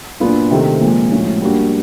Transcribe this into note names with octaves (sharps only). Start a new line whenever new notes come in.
A#2 F#3 B3 D4 F4
C3 D#3 F#3 A3 C4
A#2 F3 G#3
A2 F3 G#3 C#4 F#4
G3 A#3 D4 F#4